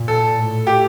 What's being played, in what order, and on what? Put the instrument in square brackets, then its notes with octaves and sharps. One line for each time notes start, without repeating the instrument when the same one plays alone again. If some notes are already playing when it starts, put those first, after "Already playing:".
Already playing: [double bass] A#2
[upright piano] A4
[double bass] A2
[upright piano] G4